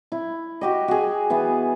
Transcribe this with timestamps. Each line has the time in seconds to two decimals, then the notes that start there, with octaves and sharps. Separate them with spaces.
0.12 E4
0.61 F#4 G4 D#5
0.88 F#4 G#4
1.30 E3 B3